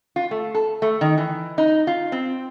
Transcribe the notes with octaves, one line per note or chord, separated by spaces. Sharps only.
F4
A3
A4
A3
D#3
E3
D#4
F4
C4